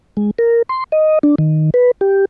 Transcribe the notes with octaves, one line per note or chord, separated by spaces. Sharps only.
G#3
A#4
C6
D#5
D4
D#3
B4
G4